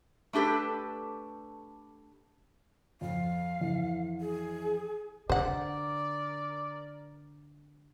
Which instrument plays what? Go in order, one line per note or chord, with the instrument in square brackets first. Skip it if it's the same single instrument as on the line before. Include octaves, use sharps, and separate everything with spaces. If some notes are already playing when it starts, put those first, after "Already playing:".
[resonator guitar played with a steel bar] A3 D4 G4 A4 B4
[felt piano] F2 [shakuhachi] F5
[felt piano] F2 E3
[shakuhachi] G#4
[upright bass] D3 [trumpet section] A#4 D5 [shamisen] C5 F#5